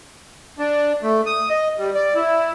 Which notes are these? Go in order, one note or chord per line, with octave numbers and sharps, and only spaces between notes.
D4
A3
D#6
D#5
G3
D5
E4